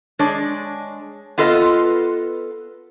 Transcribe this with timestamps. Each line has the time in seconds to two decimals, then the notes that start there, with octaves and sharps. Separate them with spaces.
0.19 G#3 D4 C#5
1.38 B3 F4 A4 B4 D#5